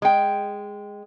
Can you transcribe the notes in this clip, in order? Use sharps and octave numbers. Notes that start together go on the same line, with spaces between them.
G#3 G5